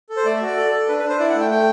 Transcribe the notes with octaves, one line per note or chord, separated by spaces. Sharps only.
A4
C5
A3 D5
E5
F#4
D5
A4
A4
D4 B4
B4
D4
C5
E4 D5
F#5
A3
G5
A3 G5